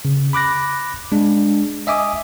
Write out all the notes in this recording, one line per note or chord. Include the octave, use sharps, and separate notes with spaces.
C#3
B5 D6 F#6 A#6
G#3 D4
D#5 E5 G#5 D6 D#6